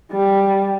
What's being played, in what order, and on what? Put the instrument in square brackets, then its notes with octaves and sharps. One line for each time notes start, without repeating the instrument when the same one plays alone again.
[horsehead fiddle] G3